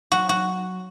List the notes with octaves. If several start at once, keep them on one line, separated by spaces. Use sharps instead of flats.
F#3 F#4
F#4